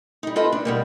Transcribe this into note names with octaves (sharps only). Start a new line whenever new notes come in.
G3 D#4
C4 F4 A4 B4 D#5 E5
D4
B2 G3 A#3